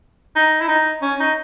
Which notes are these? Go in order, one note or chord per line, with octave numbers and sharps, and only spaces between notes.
D#4
E4
D#4
C#4
D#4